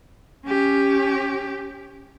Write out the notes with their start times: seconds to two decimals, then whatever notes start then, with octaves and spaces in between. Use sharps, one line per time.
0.46 C#4 G4